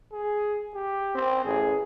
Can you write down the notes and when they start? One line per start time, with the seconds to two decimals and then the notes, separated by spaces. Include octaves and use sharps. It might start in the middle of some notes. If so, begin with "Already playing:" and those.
0.12 G#4
0.75 G4
1.15 C4
1.45 A1 G#4